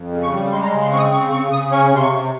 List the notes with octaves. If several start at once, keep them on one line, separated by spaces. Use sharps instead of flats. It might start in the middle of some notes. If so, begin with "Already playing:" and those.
Already playing: F2
C#3
C#6
G3
G#3 C6
A#5
C6
C#3
C6
C4 C#6
D#6
C#3 C#6
C#3 C#6
C#3 D#6
C#4 C#6
C3 C6
C#6
C3